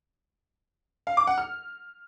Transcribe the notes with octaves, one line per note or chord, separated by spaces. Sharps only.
F5
D6
F#5
F6